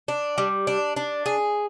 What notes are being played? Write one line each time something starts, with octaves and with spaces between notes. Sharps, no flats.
D4
G3
D4
D4
G#4